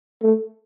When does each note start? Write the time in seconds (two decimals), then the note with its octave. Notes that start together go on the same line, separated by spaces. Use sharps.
0.23 A3